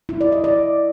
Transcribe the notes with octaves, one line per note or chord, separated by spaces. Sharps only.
E4
D5
D#5
D5